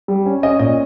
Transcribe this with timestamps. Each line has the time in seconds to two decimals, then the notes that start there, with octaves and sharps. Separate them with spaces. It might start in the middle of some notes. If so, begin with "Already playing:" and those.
0.08 G3
0.26 C#4
0.43 C#4 D#5
0.59 A#2 D#5